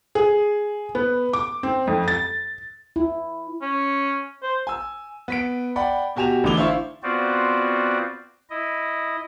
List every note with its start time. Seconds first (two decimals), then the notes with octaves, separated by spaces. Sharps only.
0.15 G#4
0.95 B3
1.33 D6
1.63 C4
1.87 F2
2.08 A6
2.96 E4
3.62 C#4
4.42 C5
4.67 G#5 E6
5.28 B3 B6 D7
5.76 D5 F#5 G5 B5
6.16 B2 F#4 G4 G#5 E7 F7
6.44 A1 D3 E3 D6 F7 G7
6.56 D4 E4 C5 E5 F5 C#6
7.03 B3 C4 F4 F#4 C5 D5
8.50 E4 D#5